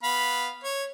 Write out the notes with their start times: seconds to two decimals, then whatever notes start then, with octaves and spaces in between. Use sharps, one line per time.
0.03 B3 F5 B5
0.64 C#5